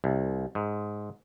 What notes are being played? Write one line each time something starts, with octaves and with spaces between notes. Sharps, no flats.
C2
G#2